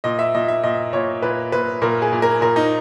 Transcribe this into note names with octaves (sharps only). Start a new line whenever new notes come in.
A#2 D#5
E5
A#2 D#5
E5
A#2 D#5
A#2 C#5
A#2 B4
A#2 B4
A#2 A#4
G#4
A#2
A#4
A#2 A#4
D#4